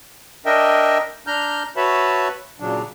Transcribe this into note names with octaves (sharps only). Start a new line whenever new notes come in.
D4 A#4 D#5 E5 G5
D4 A#5 F6 G6
F#4 B4 C#5 E5 A5 B5
A#2 C#3 F#3 D4